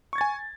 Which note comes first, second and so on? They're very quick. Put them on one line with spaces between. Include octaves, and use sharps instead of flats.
C#6 G#6 A6 G#5